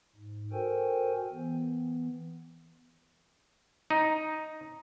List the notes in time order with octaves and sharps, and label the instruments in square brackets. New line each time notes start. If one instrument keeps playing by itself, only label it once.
[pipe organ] G#2
F#4 A4 A#4 C5 G5 G#5
E3 B3
[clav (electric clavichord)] D#4